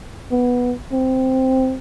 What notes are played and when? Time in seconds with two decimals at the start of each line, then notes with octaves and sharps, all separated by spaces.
0.31 B3
0.92 C4